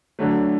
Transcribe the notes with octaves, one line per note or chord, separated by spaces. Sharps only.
D3 F#3 A3